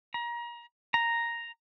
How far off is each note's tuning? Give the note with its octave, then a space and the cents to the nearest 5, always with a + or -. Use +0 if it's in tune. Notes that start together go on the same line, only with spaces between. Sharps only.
A#5 +30
A#5 +0